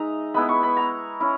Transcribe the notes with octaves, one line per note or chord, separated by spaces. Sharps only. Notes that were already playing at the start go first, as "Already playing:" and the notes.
Already playing: G#3 D#4 E5 A#5
G#3 B3 E4 B5
C#6
B5
A#5
C#4 E4